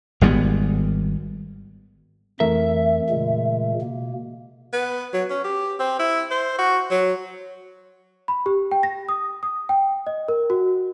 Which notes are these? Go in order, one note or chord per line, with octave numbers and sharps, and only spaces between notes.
G#1 G3 G#3 B3
F2 E3 A3 A#4 E5
A#2 C#3 G#3
B2 A#3
B3
F#3
C#4
G4
C4
E4
C5
F#4
F#3
B5
G4
G5
A#6
D#6
D#6
G5
D#5
A#4
F#4